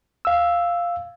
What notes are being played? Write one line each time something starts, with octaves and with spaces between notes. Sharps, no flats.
F5 E6